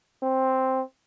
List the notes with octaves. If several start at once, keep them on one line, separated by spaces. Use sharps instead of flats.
C4